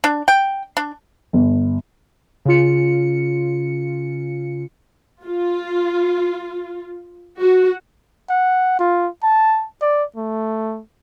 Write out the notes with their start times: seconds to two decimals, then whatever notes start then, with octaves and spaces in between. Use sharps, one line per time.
0.04 D4
0.28 G5
0.77 D4
1.33 G1
2.45 C#3 C#4 F4 C#7
5.23 F4
7.40 F#4
8.29 F#5
8.79 F4
9.23 A5
9.82 D5
10.16 A3